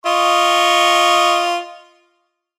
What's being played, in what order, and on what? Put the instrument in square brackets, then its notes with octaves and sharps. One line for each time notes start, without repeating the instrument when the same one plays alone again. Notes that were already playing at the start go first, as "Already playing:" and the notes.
[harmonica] F4 D#5 C#6